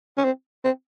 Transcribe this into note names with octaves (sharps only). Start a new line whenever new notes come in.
C#4
C4
C4